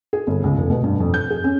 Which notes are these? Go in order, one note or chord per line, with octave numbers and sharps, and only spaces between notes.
G#4
G1
C#2
F1
B2
G2
F2
G6
G#4
C#4